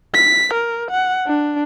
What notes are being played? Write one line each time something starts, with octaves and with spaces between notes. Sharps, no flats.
B6
A#4
F#5
D4